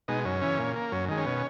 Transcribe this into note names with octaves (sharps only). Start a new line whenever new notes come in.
B2 G#3 D#4
F#2 C#4
C#3 E3
A#2
A#3
F#2 C#4
D#3 G#3
C#4
B2